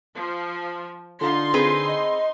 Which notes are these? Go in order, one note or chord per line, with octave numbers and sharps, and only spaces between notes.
F3
D3 D#4 F4 C6
C4 G#4 B4
D#5